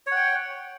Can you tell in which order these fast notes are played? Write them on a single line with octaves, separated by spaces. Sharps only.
C#5 F#5 G5